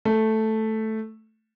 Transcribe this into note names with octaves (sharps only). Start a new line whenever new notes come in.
A3